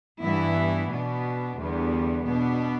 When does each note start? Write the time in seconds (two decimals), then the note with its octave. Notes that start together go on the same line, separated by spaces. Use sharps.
0.21 G2 E3 B3 E4
0.90 B2 B3 D4
1.58 E2 D3 G3 B3
2.26 B2 B3 D4